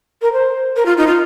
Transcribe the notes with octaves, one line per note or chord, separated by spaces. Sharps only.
A#4
C5
A#4
F4
D#4
F4